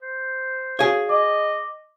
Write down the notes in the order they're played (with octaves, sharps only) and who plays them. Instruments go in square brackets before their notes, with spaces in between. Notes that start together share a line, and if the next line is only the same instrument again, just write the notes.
[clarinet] C5
[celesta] F#4 F5 [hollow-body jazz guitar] G#4 C#5
[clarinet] D#5 [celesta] D6